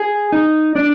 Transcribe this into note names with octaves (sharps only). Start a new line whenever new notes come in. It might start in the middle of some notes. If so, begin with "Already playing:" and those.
Already playing: G#4
D#4
D4 D5